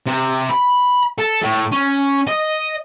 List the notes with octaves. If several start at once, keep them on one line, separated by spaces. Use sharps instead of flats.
C3
B5
A4
A2
C#4
D#5